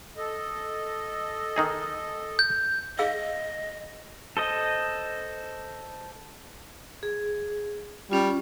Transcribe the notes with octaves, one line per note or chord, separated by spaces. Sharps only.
A4 D#5
D#3 D#4 G#4
G6
G#4 D#5 F5 E6
A4 C5 D#5
G#4
G3 C#4 F4